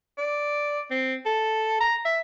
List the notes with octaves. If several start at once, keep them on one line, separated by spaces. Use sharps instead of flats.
D5
C4
A4
A#5
E5